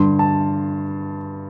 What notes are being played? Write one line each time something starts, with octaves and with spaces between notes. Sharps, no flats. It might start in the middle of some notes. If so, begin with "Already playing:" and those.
Already playing: G2 D3 C6
A5